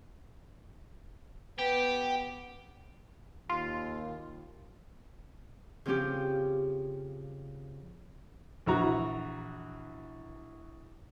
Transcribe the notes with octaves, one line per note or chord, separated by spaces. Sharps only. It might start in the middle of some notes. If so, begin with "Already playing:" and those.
B3 G4
D#2 F4
C#3 F3 C4 C#4 G4
A#1 E3 F#4 A#5